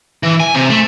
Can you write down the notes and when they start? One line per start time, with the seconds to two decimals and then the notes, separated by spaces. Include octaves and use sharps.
0.23 E3
0.40 G#5
0.55 C3
0.70 A3